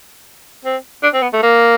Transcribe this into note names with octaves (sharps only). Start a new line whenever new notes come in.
C4
D4
C4
B3
A3
A#3